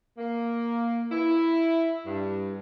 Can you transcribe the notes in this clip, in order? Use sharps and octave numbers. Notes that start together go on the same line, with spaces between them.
A#3
E4
G2